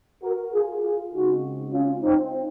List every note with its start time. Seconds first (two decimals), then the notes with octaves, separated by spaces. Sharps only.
0.22 F#4 A#4
0.53 F4 G#4
0.82 F4 G#4
1.12 C#3 G#3 C4 D#4 F#4
1.72 C#4 F4
2.02 C4 D#4